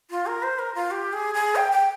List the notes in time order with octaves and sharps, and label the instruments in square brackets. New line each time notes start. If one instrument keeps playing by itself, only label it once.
[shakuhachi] F4
A#4
C5
A#4
F4
G4
G#4
G#4
G5
G5